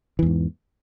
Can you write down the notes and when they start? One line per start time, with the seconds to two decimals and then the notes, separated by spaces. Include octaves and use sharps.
0.19 E3
0.23 E2
0.26 G#2